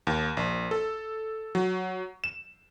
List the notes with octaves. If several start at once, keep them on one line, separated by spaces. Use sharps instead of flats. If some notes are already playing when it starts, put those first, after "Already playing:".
D#2
A#1
A4
F#3
E7